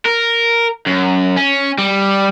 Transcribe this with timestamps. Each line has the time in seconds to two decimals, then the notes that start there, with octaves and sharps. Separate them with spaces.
0.06 A#4
0.86 F#2
1.37 C#4
1.78 G3